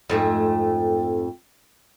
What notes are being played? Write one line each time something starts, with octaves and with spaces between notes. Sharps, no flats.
F2 G#2 A3